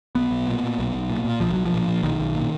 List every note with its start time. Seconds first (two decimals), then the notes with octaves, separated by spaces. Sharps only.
0.15 B1 B3
0.31 B1
0.47 A#2
0.63 A#2
0.78 B1
0.94 B1
1.10 A#2
1.25 A#2
1.40 B1 F3
1.53 B1 F#3
1.65 F3
1.72 A#2
1.88 A#2
2.03 B1 D#3
2.20 B1
2.35 A#2